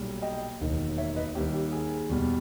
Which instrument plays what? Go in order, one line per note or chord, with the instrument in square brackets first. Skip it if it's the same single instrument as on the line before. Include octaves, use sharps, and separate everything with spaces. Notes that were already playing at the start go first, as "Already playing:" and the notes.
Already playing: [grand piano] B1 A#2 G3
D#5 G5
E1 D#2 D#3
C#5 E5
B4 D#5
D#2 D#3 G3 G4
G4
G#4
E2 B2 G3